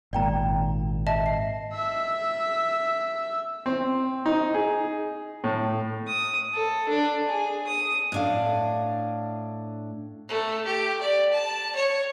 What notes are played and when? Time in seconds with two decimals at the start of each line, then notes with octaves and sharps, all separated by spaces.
0.13 G#1 A#2 D5 G5 A#5
1.07 D#5 E5 A5
1.26 C7
1.72 E5 E6
3.66 C4
4.26 D#4
4.54 G#4
5.44 A2
6.07 D#6
6.53 A4
6.89 D4
7.26 G#4
7.67 D#6
8.12 A2 D4 F5
10.28 A3
10.65 G4
11.00 D5
11.31 A5
11.75 C#5